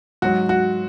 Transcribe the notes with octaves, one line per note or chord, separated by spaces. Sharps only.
G#2 F#3 F#4
F#4